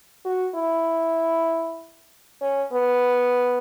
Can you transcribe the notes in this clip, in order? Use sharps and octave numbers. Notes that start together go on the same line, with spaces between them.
F#4
E4
C#4
B3